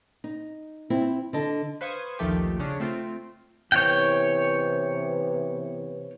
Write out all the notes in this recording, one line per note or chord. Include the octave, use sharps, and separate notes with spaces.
D#4
C4 E4
D3 D#5 A5
B4 C5 F5 C#6 D#6 G#6
A#1 D#2 D#3 F3 A3 G4
C#3 C#4 D4
A3 C4 F4
C3 E3 B3 C#5 G5